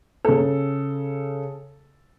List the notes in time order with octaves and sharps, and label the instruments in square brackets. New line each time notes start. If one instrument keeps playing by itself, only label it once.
[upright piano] C#3 A4